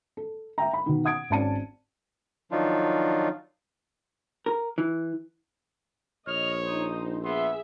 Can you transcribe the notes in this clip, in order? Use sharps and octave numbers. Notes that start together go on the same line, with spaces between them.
A4
E5 G5 A#5
B5
B2 D#3
F#5 D#6 G#6 D7
G#1 C#4 D5 A5 C#7 D#7
D#3 F3 F#3 D4 D#4 F4
A#4
E3
A#1 C#5 D#5 F6
D#4 C5 D#6
B3 G#4 E5 C6